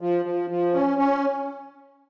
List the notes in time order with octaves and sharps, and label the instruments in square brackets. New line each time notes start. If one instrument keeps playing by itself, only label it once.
[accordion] F3
F3
F3
C#4
C#4